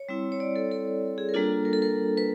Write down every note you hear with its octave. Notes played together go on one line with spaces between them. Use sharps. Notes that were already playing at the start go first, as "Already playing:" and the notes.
Already playing: C#5
G3 C4 E4
C#5
D5
A4
A4
G#4
A#4
G3 A#3 D4 F4 A4
A#4
A4
A#4
B4